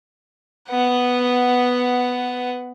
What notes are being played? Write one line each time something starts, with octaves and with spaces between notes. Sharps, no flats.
B3 F#5